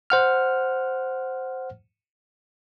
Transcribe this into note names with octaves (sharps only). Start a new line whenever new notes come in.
C5 F#5 F6